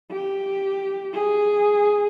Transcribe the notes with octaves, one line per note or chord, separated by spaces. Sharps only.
G4
G#4